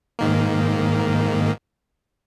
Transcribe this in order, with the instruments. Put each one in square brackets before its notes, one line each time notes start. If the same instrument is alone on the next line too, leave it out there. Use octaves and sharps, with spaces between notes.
[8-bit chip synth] G#2 D#3 A#3